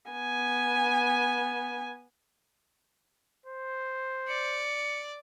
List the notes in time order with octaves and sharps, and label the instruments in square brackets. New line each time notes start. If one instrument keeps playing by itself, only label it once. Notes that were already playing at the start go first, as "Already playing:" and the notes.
[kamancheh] B3 G#5
[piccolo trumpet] C5
[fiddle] D5 [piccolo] C#7